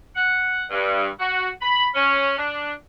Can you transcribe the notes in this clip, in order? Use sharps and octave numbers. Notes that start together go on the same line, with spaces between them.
F#5
G2
F#4
B5
C#4
D4